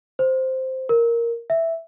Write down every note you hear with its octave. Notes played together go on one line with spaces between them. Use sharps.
C5
A#4
E5